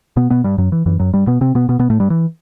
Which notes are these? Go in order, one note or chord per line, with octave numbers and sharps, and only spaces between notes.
B2 B3
B2 B3
G2 G3
F#2 F#3
E3
F#2 E3
F#2 F#3
G2 G3
B2 B3
C3 C4
B2 B3
B2 B3
B2 B3
A2 A3
G2 G3
E3